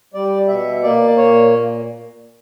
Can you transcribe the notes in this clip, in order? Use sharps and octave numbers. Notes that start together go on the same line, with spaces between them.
G3 D5
B2 E5
A#3 D5
A#2 C#5